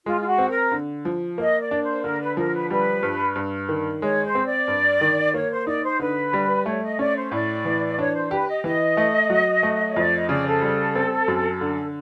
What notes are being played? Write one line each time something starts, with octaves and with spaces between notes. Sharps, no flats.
G#3 F4
F4
F#4
C4
A#4
D3
F3
A#3 D#5
D5
D4
C5
D3 A#4
B4
F3 A#4
B4
G3 B4
G2
G2
D#3
G#3 C#5
C5
C4
D5
G2
D#3
A#3 C#5
C5
D#4 D5
C5
D3 B4
G3
A3 C#5
D#5
C#4 D5
C5
A2 D5
E3
D4 C#5
C5
G4 B4
D#5
E3 D#5
A3
F#3
A3
C#5
F2 D5
D#5
C#3 D5
A4
G3
C4
F#2
D3